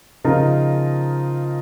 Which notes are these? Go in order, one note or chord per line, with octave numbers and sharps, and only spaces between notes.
C#3 F3 D#4 F4 A#4